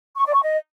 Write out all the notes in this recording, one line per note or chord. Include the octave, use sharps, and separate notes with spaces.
C#6
D5
C#6
D#5